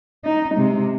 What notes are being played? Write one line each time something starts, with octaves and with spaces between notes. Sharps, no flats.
D#4
C3 G#3